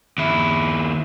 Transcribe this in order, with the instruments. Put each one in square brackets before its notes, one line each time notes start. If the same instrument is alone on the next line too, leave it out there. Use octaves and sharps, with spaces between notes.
[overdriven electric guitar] D#2 E4